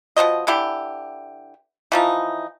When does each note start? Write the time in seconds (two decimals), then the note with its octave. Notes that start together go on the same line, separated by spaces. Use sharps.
0.17 B2 F3 C5 D#5
0.47 D3 E3 E4 G4
1.92 E3 F3 D#4